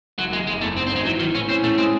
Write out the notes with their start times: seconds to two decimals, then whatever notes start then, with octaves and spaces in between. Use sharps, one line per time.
0.18 F#1 F#3
0.33 F#1 G#3
0.47 F#1 G#3
0.61 E2 A3
0.76 G#2 C4
0.87 C4
0.91 G#1 G#3
1.05 E3 F#3
1.19 D#3 E3
1.35 A2 C#4
1.49 C4 C#4
1.64 A2 A3
1.78 G#3 C4